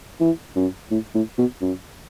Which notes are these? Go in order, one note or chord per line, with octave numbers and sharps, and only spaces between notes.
E3
F#2
A2
A2
B2
F#2